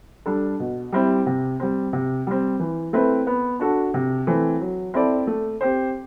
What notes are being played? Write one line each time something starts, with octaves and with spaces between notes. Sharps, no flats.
G3 D4 A4
B2
G3 C4 E4 G4
C3
G3 C4
C3
G3 C4
E3
A3 C4 E4 B4
B3
D4 F#4 A4
C3
E3 A3 C4
F#3
C4 E4 A4 D5
A3
C4 G4 C5